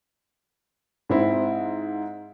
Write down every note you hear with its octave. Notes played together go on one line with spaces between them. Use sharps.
G#2 C4 E4